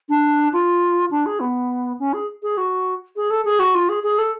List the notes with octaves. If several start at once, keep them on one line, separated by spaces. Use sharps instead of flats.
D4
F4
D4
G#4
B3
C#4
G#4
G#4
F#4
G#4
A4
G#4
F#4
F4
G#4
G#4
A4